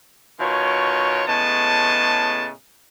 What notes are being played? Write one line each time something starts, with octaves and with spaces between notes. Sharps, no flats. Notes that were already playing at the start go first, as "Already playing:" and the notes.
B2 D#3 F4 C#5
A2 C#3 G#3 B3 A5